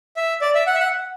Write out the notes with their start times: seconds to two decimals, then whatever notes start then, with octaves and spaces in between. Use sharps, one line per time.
0.17 E5
0.41 D5
0.55 E5
0.67 F#5
0.75 E5
0.80 F#5